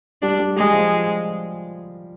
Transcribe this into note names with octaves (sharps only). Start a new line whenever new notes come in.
G3 D4
G3
G3 G#3
F3